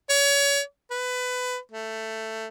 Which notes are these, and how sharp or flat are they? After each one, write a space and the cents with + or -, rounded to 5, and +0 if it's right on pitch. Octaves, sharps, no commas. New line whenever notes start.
C#5 +30
B4 +20
A3 +10